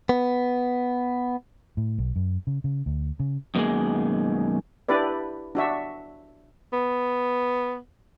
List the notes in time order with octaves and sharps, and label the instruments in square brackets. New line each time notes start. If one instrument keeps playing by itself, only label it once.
[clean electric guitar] B3
[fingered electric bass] A2
B1
F#2
C#3
C#3
D2
C#3
[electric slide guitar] F#2 B2 D#3 G#3 A#3 G#4
[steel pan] D4 E4 G4 B4 D5
D4 F#4 E5
[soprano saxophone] B3